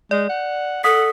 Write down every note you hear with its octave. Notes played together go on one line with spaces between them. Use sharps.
G#3 D5
F#5
A4 F#5 D#6 B6